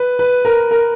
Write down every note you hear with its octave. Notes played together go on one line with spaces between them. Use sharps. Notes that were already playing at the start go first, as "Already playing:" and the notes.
Already playing: B4
B4
A#4
A#4